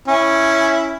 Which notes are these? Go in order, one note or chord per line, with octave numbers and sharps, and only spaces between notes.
C#4 E4